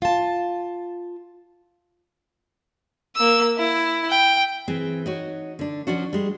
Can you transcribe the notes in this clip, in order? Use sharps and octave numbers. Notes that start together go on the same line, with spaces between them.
F4 A5
A#3 E6
E4
G5
E3 C4 G#4
D#4 F#4 C#5
D3 D4
F3 C#4 D4 F#4
G3 G#3